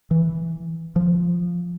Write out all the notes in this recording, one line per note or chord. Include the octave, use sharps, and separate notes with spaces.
E3
F3